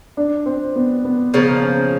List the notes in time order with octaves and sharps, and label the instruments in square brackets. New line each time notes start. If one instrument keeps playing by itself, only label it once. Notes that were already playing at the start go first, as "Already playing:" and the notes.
[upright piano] D4
C4
B3
B3
[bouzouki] C#3 F3 A#3 [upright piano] B3
[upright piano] C4
C#4